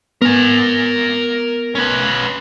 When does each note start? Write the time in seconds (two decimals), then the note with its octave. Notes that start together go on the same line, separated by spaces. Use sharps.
0.22 B3 A#4 G#5
1.75 C#4 B4